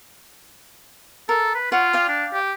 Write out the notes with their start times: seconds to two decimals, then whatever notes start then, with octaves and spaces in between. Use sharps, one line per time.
1.29 A4 A#4
1.55 B4
1.72 F4 C#5 F#5 C#6
1.93 D5 F5 G5
2.09 D4
2.34 G4